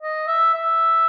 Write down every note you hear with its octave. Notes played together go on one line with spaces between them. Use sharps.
D#5
E5
E5